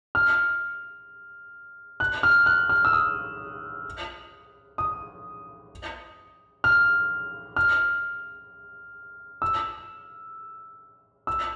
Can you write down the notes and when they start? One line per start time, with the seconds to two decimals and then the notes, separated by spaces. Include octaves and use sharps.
0.15 F6
2.00 F#6
2.23 F6
2.46 F#6
2.69 F6
2.85 E6
2.93 D#6
4.78 D#6
6.64 F6
7.56 F6
9.42 E6
11.27 E6